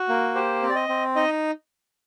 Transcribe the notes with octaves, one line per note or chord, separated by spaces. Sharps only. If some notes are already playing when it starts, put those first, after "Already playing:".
Already playing: F#4
A#3
G4 C5
C4
D5
D#5
C4
D#4 D#5